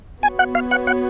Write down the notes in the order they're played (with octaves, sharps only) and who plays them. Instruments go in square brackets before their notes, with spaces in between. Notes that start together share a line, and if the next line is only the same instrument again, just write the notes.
[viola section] B3 F#4 C#5 [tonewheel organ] G#5
[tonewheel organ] F#5
F5
F#5
F#5